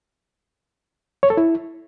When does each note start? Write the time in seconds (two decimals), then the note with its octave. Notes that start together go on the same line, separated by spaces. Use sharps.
1.23 C#5
1.30 A4
1.37 E4